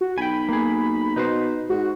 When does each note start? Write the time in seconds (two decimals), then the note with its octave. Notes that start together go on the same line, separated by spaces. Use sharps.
0.01 F#4
0.18 B1 G5 G#5 B5
0.49 A#3 G#4
1.16 B2 D#4 B4 C5
1.70 G#2 F#4